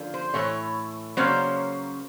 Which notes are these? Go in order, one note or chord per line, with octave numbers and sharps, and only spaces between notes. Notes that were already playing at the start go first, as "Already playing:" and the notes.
Already playing: D3 F3 A#3 C#4
C5
A2 E3 A3 C#5
C#3 F#3 A#3 C#4 C5